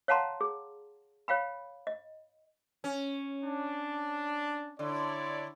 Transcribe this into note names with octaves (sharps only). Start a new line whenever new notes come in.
C#5 F5 F#5 A5 A#5 C6
G#4
C#5 F5 G5 B5
D#5
C#4
D4
D3 E4 C#5 D5